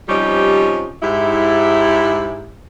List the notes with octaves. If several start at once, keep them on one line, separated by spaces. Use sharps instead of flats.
C3 F3 G3 C#4 D#4 G4
G#2 E4 G4